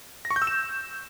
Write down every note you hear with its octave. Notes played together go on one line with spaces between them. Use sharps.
A#6
C#6
G6
E6
E7